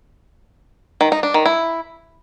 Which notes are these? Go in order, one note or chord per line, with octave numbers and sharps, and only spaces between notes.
D#3
D#4
D4
D#3
E4